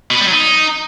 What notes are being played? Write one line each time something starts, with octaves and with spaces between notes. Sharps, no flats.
B2
B3
G3
F#3
D#4